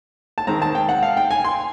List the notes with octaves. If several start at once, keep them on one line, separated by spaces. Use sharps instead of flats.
A5
D#3 G#3 C4 A#5
A5
G5
F#5
F5
G5
G#5
C6